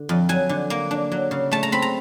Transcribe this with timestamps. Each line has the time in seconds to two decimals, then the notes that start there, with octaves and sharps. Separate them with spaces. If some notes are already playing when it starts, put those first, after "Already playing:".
Already playing: D3
0.09 F2
0.29 F#3 G#5
0.49 D3
0.70 A#3
0.91 D4
1.12 F#3
1.31 C#3
1.52 A3 A5
1.63 A#5
1.72 C4 B5
1.82 A#5